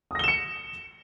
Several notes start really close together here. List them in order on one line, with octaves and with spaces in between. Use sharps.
D#6 A#6 G7 E7 C#7